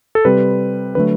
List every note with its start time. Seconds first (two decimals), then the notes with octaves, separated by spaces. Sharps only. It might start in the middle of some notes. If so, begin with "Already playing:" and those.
0.15 A4
0.25 C3 G3 C4 B4
0.95 D3 F#3 A3 B4